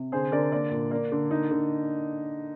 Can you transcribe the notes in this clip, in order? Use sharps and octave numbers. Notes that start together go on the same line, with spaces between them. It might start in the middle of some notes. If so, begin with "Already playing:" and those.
Already playing: C3
D3 G#4 C5
D3 A#4 D5
A#3 A#4 D5
A#2
A#3 A#4 D5
D3
A#3 D#4
D3